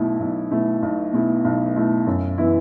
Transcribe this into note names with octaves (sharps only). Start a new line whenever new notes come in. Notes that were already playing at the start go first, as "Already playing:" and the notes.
Already playing: B1 B2 A3 E4
B1
B2 A3 E4
B1
B2 A3 E4
B1
B2 A3 E4
F#2
E3 B3 E4